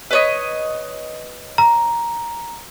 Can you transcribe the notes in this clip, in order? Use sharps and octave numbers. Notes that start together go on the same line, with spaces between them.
B4 C#5 D#5
A#5